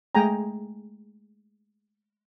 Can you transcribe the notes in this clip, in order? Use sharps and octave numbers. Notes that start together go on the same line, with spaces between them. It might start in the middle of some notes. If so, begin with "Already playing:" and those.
G#3 A3 G#4 G5 G#5 A#5